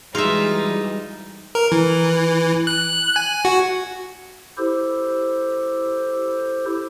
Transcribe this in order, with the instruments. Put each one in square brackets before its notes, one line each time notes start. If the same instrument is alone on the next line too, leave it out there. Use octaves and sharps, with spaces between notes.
[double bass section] E3 G3 G#3 [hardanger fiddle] D#4 [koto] F4 E5 [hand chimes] F#4 G#4
[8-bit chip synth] A#4
E3
F#6
G#5
F#4
[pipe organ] E4 G4 A4 C5